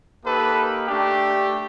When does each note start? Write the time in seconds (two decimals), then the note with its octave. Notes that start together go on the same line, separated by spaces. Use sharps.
0.24 A#3 D#4 G4 A4 B4
0.87 A3 D4 G4